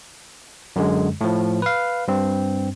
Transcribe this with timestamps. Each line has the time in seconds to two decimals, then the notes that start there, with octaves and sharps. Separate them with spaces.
0.76 F#2 D3 G#3
1.21 A2 F3
1.62 B4 F5
2.08 G2 C4